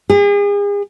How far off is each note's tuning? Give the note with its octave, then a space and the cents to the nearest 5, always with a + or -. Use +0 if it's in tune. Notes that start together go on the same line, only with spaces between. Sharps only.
G#4 -40